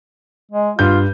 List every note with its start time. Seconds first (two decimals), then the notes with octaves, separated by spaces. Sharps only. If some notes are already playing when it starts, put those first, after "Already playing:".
0.51 G#3
0.79 G2 F4 G6